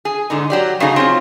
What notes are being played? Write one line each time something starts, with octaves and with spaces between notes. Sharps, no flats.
G#4
G#2 D3 D#4
F#3 G4 D5
C#3 F#3 A3 D#4 G#4
C4 C#4 F4